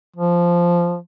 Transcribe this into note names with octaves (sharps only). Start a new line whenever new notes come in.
F3